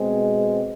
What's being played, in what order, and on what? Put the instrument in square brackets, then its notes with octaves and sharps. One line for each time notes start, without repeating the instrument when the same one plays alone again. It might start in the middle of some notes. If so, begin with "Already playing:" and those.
Already playing: [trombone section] B2 G#3 C4